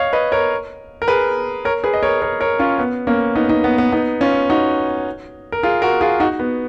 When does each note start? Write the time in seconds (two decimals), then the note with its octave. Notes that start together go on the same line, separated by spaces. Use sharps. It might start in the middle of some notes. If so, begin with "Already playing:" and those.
Already playing: C#5 D#5 F5
0.13 B4 D#5
0.32 A#4 C#5
1.02 A#4
1.08 G#4 B4
1.65 A#4 C#5
1.84 G#4 B4
1.94 D#5
2.03 A#4 C#5
2.22 A#4 C#5
2.40 A#4 C#5
2.59 C#4 F4
2.78 B3
3.07 A#3 C#4
3.35 B3 D#4
3.50 B3 D#4
3.64 B3
3.78 B3
3.92 B3 D#4
4.21 C#4 F4
4.50 D#4 F#4
5.52 A#4
5.63 F4 G#4
5.82 F#4 A#4
6.01 F4 G#4
6.20 D#4 F#4
6.39 B3